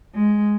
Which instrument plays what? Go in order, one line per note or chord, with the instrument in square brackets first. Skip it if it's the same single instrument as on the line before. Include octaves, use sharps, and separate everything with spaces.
[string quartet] G#3